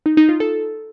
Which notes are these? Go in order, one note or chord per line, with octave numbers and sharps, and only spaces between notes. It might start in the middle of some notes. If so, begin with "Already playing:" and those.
D#4
D#4
F4
A4